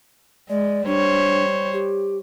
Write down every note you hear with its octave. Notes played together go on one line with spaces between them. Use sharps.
G#3 D5
G3 D4 C5 C#5
G4